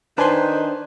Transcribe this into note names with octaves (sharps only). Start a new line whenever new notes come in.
D#3 D4 D#4 B4 C5 G#5 C6